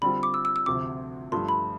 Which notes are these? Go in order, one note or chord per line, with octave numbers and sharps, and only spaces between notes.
D3 G3 C4 F4 B5
D6
E6
E6
E6
D2 C3 F3 C4 D6
G2 F3 A3 C6
B5